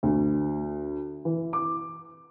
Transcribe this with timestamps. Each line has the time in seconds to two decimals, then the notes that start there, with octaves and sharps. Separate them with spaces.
0.03 D2
1.25 E3
1.53 D6